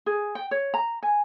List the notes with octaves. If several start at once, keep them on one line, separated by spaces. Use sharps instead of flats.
G#4
G5
C#5
A#5
G#5